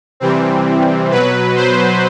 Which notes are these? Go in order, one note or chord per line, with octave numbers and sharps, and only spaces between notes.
C3 E3 G3 C4
B2 F#3 B4
C5